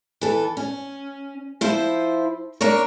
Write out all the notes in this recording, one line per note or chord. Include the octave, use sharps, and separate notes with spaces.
E3 A4
C#4
F3 E4 C5
A#3 D4 A#4 C#5